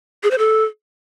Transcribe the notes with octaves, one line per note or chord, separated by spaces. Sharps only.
G#4
C5
A4